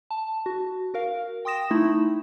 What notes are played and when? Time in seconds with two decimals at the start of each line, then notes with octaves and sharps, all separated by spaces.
0.11 A5
0.46 F#4
0.94 F#4 A#4 F5
1.45 G5 C6 D#6 A#6 E7
1.71 A3 D#4 E4